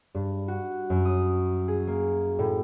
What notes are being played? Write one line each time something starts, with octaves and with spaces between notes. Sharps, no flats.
G2
F#4
F#2
D#6
G#4
A#3
A2